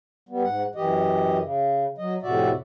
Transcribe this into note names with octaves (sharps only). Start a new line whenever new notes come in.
G3 B3
G#2 F#5
F#2 E3 G4 D#5
C#3
F#3 D#5
F2 A2 C3 F#4 D5 E5